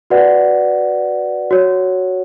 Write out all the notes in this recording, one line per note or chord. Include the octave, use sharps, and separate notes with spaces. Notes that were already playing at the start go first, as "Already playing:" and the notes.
F#4 B4 D5 F#5
F#4 C#5